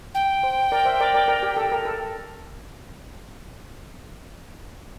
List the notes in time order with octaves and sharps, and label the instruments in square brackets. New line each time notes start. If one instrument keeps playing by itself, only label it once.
[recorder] G5
[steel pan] C5
A#4 D5
C5 E5
A#4 D5
A#4 D5
A#4 D5
G4
A4
A#4
A4